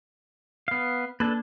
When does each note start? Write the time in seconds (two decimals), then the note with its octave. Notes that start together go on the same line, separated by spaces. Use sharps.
0.68 B3 F5
1.20 A#3 D4 A4 B4